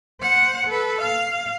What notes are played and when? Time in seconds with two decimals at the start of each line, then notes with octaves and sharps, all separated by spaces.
0.21 C5 F#5
0.67 A4 B4
1.01 F5